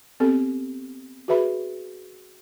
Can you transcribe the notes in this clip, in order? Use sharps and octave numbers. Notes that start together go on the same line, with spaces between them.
B3 C4 G4 A4
F#4 G#4 B4 E5 B5